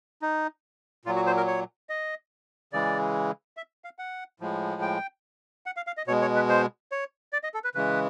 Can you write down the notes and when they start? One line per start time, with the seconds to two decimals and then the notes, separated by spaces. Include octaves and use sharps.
0.22 D#4
1.05 A#2 F#3 F4
1.16 F#4
1.27 C5
1.37 A#4
1.47 C#5
1.89 D#5
2.73 C#3 E3 G#3 D5
3.57 E5
3.84 F5
3.99 F#5
4.40 A2 F3 G#3
4.82 G5
5.66 F#5
5.77 F5
5.87 F5
5.97 D#5
6.07 B2 C#5
6.11 G#3
6.22 C#5
6.36 B4
6.49 C5
6.92 C#5
7.33 D5
7.43 D#5
7.54 A4
7.64 B4
7.75 C#3 E3 G#3 B4